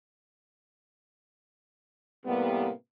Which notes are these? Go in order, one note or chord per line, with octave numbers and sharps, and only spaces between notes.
A2 C3 G3 A#3 B3